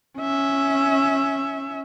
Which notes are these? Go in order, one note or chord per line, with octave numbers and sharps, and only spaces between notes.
C#4 E5